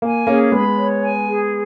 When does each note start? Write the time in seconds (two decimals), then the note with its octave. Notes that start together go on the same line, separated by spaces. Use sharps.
0.02 A#3 G#5
0.27 A#3 C#4 G#4
0.52 G#3 B3 B5
0.77 C#5
1.02 G#5
1.27 G#4